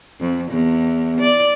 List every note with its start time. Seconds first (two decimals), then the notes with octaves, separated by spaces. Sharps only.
0.20 F2
0.51 E2
1.20 D5